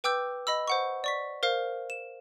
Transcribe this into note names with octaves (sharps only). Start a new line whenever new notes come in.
B4 G5 D6 E6 G6
D#5 B5 E6
C5 F#5 C#6
D5 C#6 B6
A#4 C5 F5
E7